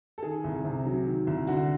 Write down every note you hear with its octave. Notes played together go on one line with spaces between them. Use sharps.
A4
D#3 G#4
C2
C3
F#3
D#3
C2
D3 F#4